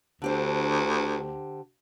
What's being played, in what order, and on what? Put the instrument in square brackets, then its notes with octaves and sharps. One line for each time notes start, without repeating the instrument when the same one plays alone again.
[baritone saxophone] D2 [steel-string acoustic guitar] D3 G4 C5